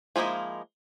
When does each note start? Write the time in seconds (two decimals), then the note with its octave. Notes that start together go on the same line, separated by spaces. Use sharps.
0.16 F3 G#3 A#3 D#4 E4